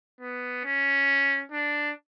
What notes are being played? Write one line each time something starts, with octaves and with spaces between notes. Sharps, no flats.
B3
C#4
D4